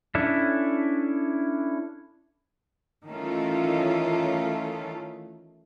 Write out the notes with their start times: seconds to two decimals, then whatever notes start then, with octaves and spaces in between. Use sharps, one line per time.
0.15 C#4 D4 E4 A4
3.06 D#3 E3 A3 C#4 F4 A4